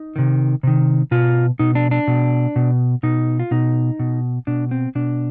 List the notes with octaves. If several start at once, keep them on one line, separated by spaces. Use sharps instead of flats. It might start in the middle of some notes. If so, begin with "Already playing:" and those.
Already playing: D#4
C3 D#3
C3 D#3
B2 F4
B2 D#4
D4
D4
B2
B2
B2 D#4
F4
B2 D#4
B2
B2 D4
C4
B2 D4